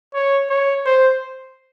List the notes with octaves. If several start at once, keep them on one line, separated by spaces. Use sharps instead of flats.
C#5
C#5
C5